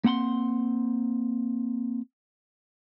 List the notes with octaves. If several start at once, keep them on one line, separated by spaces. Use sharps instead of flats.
A#3 C4 F#5 B5 C6